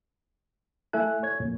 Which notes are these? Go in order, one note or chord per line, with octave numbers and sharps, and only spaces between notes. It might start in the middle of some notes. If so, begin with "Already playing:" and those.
A3 E4 A4 E5 G#5 F#6
C#5 G#6
F2 A#2